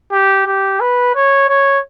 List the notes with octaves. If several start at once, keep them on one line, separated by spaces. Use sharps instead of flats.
G4
G4
B4
C#5
C#5